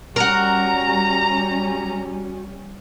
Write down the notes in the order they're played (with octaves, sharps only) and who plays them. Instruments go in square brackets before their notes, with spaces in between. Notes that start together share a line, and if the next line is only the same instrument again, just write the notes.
[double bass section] G3 C#4 [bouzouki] F#4 A#4 [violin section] A#5